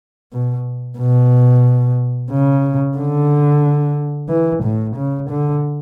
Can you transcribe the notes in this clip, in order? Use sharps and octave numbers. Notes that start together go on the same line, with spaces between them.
B2
B2
C#3
D3
E3
A2
C#3
D3